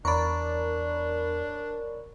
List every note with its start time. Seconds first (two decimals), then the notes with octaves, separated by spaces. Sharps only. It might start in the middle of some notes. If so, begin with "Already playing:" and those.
0.05 E2 D4 A#4 C#5 D5 B5 C#6